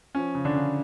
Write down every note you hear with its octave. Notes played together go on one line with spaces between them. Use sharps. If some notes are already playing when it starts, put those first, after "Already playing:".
F3 C#4
C#3
D3 D4
C#3